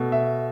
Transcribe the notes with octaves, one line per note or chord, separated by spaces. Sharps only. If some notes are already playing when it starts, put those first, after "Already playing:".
Already playing: B2 A3
E5